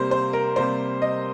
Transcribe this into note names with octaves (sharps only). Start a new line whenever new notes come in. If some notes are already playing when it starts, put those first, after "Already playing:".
Already playing: C3 G3 A#3 C5
C5
A#4
C3 G3 A#3 C5
D#5